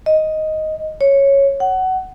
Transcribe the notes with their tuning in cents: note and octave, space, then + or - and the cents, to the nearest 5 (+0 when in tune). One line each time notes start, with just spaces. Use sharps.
D#5 +5
C#5 -5
F#5 +20